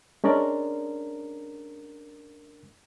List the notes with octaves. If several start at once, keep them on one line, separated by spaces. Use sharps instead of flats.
G#3 C#4 D4 A#4 D5